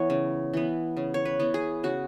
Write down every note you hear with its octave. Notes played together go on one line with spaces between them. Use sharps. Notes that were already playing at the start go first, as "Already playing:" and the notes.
Already playing: E3 B3 C#5
C#3
E3 B3
C#3
C#5
B4
E3 B3
G#4
C#3 F#4